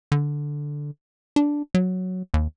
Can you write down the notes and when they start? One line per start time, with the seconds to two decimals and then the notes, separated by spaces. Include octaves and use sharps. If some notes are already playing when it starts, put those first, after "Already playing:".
0.12 D3
1.36 D4
1.74 F#3
2.34 D#2